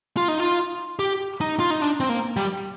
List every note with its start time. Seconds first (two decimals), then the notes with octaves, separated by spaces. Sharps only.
0.17 F4
0.28 D#4
0.40 F4
0.99 G4
1.41 D#4
1.60 F4
1.70 D#4
1.82 D4
2.00 C4
2.09 A#3
2.37 G3